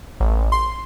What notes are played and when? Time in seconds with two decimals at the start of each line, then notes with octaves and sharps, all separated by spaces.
0.20 A1
0.52 C6